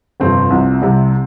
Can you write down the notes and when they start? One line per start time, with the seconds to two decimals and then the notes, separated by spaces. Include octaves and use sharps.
0.20 G1 F2 C3 F3 C4
0.50 C2 C3 F3
0.82 C2 C3 G3